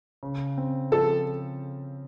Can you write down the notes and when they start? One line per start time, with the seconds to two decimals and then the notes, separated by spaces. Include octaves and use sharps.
0.23 C#3
0.58 C4
0.92 F3 A4